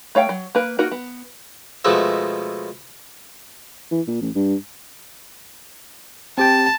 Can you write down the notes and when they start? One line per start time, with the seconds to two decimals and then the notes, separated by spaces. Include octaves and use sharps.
0.15 A3 C#5 F5 G5
0.29 F#3
0.55 A#3 B4
0.79 A#3 D#4 F#4 A#4
0.91 B3
1.84 B2 F3 G#3 A3 F#4 E5
3.91 E3
4.07 A#2
4.21 A1
4.35 G2
6.38 C4 G4 G5 A5